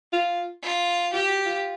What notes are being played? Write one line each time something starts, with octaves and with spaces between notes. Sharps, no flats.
F4
F4
F4 G4
F#4
F4